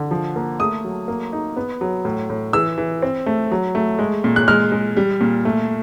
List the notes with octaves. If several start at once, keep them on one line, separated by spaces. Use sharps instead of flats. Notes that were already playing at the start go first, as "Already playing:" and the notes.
Already playing: D3
F3
A#3
A3 D#6
F#3
A#3
D#4
B3
F#3
A2
A2
E3 E6
E3
C4
A3
F#3
A3
G#3
A#2
F#6
G#3 F6
G#3
G3
A#2
A3